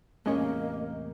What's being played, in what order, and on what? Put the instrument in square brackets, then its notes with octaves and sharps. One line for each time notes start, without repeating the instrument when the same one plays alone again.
[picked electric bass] E2 A2 C3 [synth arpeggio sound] G#3 C#4 [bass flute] A#3 [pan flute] D#5